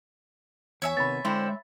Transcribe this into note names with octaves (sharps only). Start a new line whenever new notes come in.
E2 C#5 E5 G#5
C3 D#3 B3 B5 A6
D3 G#3 C4 E4 C6